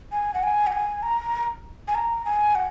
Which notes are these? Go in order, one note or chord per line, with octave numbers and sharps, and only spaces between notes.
G#5
F#5
G#5
F#5
G#5
A#5
G#5
A#5
G#5
F#5